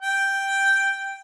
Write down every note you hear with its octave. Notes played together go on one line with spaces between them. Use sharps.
G5